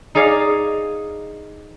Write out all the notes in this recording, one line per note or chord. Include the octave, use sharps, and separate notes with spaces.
D#4 G#4 D5 F5